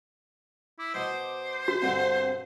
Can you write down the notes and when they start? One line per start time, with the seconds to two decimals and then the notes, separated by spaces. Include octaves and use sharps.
0.79 E4 D6
0.94 B2 C5 D#5
1.68 F#4
1.82 G2 B2 D3 C4